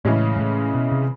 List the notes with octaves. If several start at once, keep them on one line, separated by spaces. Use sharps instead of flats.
A2 C#3 E3 G#3 C#4
G#2
A2
B2
C3